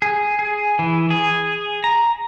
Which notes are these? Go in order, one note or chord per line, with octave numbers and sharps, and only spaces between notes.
G#4
G#4
E3
G#4
A#5